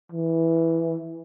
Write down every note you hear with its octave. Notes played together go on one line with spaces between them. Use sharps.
E3